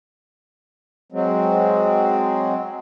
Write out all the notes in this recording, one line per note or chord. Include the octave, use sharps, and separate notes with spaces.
F#3 G#3 C4